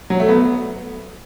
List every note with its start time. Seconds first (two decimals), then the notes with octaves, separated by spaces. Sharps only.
0.10 F#3
0.20 A3
0.29 B3